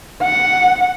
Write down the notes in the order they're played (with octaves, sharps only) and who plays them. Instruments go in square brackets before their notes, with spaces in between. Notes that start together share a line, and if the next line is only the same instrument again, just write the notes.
[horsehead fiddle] F#5